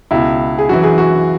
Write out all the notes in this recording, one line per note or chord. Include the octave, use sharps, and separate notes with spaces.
C#2 B2 E4
G#4
F#2 E3 F#4
G#4
F#4